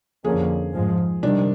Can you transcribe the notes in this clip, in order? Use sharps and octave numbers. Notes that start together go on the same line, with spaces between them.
F2 D3 F3 A#3 C#4 G#4
G#2 F3 G#3
C3 D#3 G3 D4